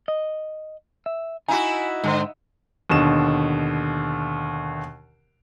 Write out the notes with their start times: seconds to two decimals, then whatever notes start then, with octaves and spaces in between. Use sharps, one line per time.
0.08 D#5
1.06 E5
1.48 D#4 E4 F#4 G#5
2.04 G#2 D3 G#4 C5
2.90 D#2 B2 D3 E7